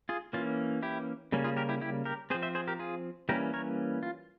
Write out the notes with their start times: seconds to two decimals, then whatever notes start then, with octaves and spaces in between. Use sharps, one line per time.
0.09 F4 G#4
0.33 E3 A#3 C#4 F4
0.83 E4 G4
1.32 C#3 G3 A#3 C#4
1.44 F4 G#4
1.57 G4 A#4
1.69 E4 G4
1.81 E4 G4
2.05 G4 A#4
2.30 C4 G#4 C5
2.34 F3
2.43 C5 E5
2.55 G#4 C5
2.68 G4 A#4
2.79 F4 G#4
3.29 E3 G3 A#3 C#4 G4 A#4
3.53 A#4 C#5
4.03 F4